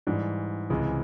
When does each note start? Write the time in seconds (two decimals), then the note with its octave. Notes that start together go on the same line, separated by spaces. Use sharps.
0.07 G#2 E3 G3
0.70 C#2 C3 E3 G#3